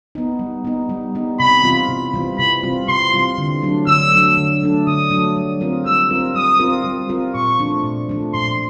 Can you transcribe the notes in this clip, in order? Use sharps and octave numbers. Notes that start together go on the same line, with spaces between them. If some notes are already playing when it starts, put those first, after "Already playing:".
B3 D#4
G3
B3 D#4
G3
B3 D#4
C3 B5
E3 G3 C4 F4
C3
E3 G3 C4 F4
C3 B5
E3 G3 C4 F4
C3 C6
E3 G3 C4 F4
D3
F#3 A3 D4
D3 E6
F#3 A3 D4
D3
F#3 A3 D4
D3 D#6
F#3 A3 D4
G3
C4 F4 A#4
G3 E6
C4 F4 A#4
G3 D#6
C4 F4 A#4
G3
C4 F4 A#4
A#2 C#6
F3 A3 D4
A#2
F3 A3 D4
A#2 C6